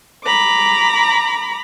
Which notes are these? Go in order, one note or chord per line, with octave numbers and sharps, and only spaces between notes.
A#5 B5 D6